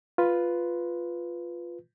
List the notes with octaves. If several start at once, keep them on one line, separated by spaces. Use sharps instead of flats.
F4 B4